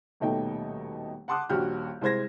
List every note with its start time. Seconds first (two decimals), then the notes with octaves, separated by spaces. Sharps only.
0.20 D#1 B2 A3 D#4 G5
1.28 F#5 A5 C6 D6 D#6 F#6
1.49 D#1 A#1 F#4 G4 F6 G6
2.01 C2 G#3 C5 G#6 A#6